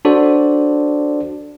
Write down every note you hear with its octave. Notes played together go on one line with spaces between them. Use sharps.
D4 F#4 A4 C5 D5